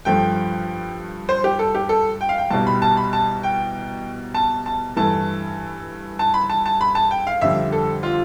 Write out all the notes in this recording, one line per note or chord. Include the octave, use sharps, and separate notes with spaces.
G2 F3 A3 G5
C5
G4
A4
G4
A4
G5
F5
G5
C2 B2 G3 A5
B5
A5
B5
A5
G5
A5
A5
G2 E3 A3 A5
A5
B5
A5
A5
B5
A5
G5
F5
F2 D3 G3 E5
A4
F4